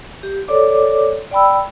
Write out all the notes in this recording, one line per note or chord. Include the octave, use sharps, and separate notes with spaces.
G4
A4 C#5 D5 D6
D5 G5 B5 E6